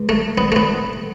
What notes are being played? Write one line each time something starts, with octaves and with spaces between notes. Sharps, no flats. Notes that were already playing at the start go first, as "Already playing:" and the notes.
Already playing: C#2
A3
B3
A3
B3